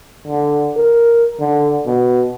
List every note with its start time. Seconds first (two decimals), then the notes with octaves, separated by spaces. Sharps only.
0.27 D3
0.77 A#4
1.40 D3
1.86 B2